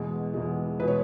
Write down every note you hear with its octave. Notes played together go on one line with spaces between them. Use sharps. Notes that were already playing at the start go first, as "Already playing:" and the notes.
Already playing: E2 B2 G#3
E2 B2 G#3
E2 B2 G#3 B4
C#5